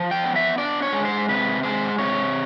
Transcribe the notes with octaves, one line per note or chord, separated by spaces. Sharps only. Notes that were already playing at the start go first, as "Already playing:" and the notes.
Already playing: F3
G5
B3
E5
D4 D5
C#5
G#3
C5
C3 B4
G#3 C5
C3 C#5